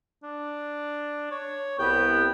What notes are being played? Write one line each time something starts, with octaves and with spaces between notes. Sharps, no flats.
D4
C#5
C2 B3 G5